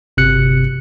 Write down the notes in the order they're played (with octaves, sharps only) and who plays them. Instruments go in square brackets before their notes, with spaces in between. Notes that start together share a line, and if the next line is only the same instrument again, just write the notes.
[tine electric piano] G1 C3 F#6 C#7